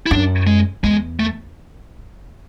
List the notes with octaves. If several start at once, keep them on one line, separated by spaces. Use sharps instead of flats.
E4
F#2 D4
G#3
E2 G#3
A3